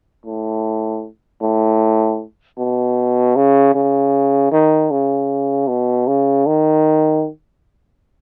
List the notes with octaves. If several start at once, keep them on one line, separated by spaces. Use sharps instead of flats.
A2
A2
B2
C#3
C#3
D#3
C#3
B2
C#3
D#3